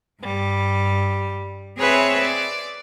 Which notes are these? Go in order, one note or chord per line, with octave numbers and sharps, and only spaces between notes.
G2 G3
C4 G#4 B4 C#5 E5
D5